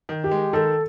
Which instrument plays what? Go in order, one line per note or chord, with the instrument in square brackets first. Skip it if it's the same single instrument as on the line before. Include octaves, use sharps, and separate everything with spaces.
[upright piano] D#3
[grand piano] G4
[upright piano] G#3
[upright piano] D#3 [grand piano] A4